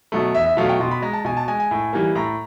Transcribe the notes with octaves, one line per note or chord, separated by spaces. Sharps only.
B2 F#3 A3
E2 E5
E5
B2 F#3 A3 F5
G5
B2 C6
B5
G#3 A#5
A5
B2 G#5
A5
G#3 G#5
G#5
A2
E3 G3 A#3
A2 A#5